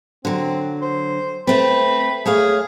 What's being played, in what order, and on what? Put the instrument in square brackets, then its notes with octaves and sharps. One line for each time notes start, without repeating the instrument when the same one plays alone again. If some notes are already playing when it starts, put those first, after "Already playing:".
[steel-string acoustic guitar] D3 F#3 [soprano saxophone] C4
[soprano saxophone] C5
[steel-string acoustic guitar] A3 C4 [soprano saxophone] B4
[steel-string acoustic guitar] A3 C#5 F5 [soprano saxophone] G#4